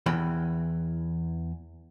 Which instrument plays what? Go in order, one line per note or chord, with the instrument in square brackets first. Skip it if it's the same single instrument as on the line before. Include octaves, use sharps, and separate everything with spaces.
[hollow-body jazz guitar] E2 E3 G5 B5